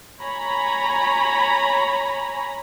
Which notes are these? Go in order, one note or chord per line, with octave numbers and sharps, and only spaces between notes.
C#5 G#5 A#5 B5